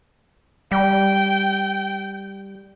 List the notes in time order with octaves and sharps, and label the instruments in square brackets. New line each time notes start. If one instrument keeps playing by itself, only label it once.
[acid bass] G3 [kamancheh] G5